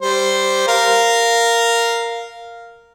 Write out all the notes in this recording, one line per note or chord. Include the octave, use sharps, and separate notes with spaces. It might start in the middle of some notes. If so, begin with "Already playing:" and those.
G3 C5
A#4 F5